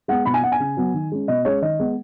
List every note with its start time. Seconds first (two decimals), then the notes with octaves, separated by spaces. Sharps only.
0.08 G#3 B3 F#5
0.25 B2 B5
0.34 G#5
0.43 B3 F#5
0.52 G#5
0.60 C#3
0.77 F#3 B3
0.94 D#3
1.12 G#3 C#4
1.28 B2 D#5
1.45 G#3 C#4 C#5
1.62 D#3 D#5
1.79 G#3 B3